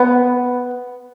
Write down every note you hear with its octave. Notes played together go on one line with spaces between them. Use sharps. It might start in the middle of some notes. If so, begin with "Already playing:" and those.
Already playing: B3